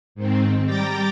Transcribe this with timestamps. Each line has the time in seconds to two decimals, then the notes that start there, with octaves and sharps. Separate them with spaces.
0.15 G#2 D#3 C4
0.66 G3 G5 A#5 D6 A6